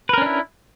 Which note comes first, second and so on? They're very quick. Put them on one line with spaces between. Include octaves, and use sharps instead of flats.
B4 A#4 C#4 D4 E4